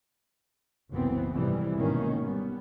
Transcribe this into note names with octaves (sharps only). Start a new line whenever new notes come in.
F#1 C2 E3 B3 C4
F2 G#2 C3 E3 G3
G#1 G#2 B2 D#3 A#3 C#4
G3 B3